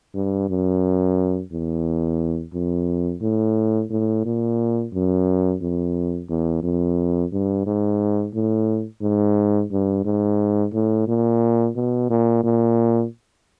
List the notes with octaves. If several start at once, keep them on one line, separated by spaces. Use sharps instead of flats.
G2
F#2
E2
F2
A2
A2
A#2
F#2
F2
E2
F2
G2
G#2
A2
G#2
G2
G#2
A2
A#2
B2
A#2
A#2